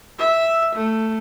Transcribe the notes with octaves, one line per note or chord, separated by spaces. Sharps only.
E5
A3